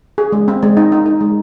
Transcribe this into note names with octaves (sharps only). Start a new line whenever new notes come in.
G#4
G#3
C4
G#3
D#4
D#4
D#4
G#3